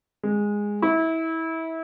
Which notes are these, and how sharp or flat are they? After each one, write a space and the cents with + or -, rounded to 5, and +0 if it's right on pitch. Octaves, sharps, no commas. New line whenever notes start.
G#3 -10
E4 -25